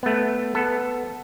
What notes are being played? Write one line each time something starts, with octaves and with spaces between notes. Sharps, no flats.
A3 B3
B3 A4